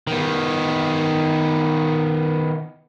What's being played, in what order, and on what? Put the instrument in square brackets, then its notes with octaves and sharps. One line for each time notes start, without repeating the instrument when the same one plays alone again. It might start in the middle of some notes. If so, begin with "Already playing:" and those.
[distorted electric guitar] D#3 B3